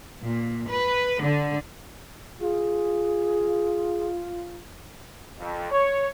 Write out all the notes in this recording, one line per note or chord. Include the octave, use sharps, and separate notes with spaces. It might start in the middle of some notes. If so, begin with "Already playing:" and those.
A#2
B4
D3
F4 G#4
F2
C#5